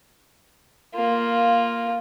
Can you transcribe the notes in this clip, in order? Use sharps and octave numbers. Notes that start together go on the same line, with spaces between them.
A#3 F4